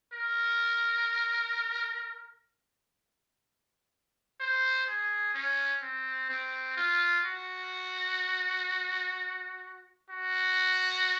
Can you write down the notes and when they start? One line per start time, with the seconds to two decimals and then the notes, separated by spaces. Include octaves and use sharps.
0.12 A#4
4.40 C5
4.87 G#4
5.34 C#4
5.82 C4
6.29 C4
6.77 F4
7.25 F#4
10.09 F#4